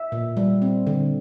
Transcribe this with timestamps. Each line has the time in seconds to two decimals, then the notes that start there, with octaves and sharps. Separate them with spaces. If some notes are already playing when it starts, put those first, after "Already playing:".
Already playing: E5
0.12 A#2
0.37 G3
0.62 C4
0.87 D3